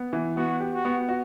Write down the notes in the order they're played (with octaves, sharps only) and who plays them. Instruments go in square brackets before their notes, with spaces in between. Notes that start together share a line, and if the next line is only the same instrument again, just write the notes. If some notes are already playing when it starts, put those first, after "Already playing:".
Already playing: [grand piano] B3
E3
[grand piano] B3 [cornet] F#4
[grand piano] G4
[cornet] F#4
[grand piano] B3
F#4